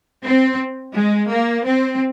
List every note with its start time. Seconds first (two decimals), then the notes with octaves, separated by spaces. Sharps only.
0.24 C4
0.94 G#3
1.30 A#3
1.65 C4